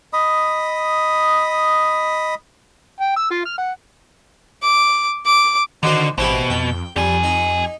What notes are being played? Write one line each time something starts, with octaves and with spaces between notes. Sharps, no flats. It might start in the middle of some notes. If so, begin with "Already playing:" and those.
D#5 B5 D#6
G5
E6
F4
F6
F#5
D6
D6
D3 D#3 D#4 F#4 C5
A1 B2 C4 E4 G4
F2 G5
F2 G3 G4 G#5
D#4